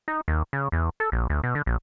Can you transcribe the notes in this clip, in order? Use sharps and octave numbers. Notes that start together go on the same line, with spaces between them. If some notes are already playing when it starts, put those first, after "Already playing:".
D#4
D#2
C#3
E2
A4
A#1
D2
B2
D3
A#1